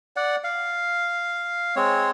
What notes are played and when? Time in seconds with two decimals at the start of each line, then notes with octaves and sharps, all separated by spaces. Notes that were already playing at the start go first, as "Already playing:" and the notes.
0.16 D5 F#5
0.44 F5
1.76 G#3 C4 C#5